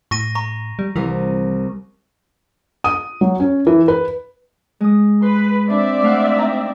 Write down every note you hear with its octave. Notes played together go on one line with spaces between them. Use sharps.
A2 C#6 A#6 D#7
A#5 C#6
G3
C2 E3 A#4
D#6
F#3
C#4
E3
B4
G#3 D#6
B4 C6
C4 D4 D5 E5
A3 F5 F#5
D#4 G5 A#5